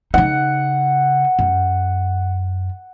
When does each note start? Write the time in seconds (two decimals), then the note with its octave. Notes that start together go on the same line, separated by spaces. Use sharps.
0.14 C#3 D#4 F#5
1.39 F#2